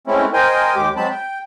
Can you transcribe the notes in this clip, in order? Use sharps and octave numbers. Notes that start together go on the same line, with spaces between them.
G#3 A3 C4 C#4 E4
A#4 C5 D#5 G5 G#5
D#2 G#3 G4 D6
F#3 G#3 C4 A5 B5
G5